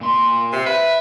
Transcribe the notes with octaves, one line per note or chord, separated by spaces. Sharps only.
A#2 C6
C3
B4 E5